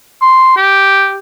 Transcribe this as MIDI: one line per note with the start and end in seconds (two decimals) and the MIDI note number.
0.22 0.54 84
0.57 1.18 67